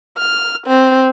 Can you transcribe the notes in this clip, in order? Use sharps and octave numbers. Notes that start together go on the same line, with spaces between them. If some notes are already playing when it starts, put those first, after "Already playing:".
F6
C4